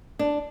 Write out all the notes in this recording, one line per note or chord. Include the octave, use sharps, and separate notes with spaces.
D4